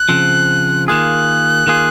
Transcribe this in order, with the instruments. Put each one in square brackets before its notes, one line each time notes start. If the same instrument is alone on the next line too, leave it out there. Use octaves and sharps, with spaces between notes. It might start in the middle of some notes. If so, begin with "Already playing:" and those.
Already playing: [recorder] F#6
[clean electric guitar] C#3 F3 C4
[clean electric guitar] D#3 A#3 F4 G#4 [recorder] F#6
[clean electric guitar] D#3 A#3 F4 G#4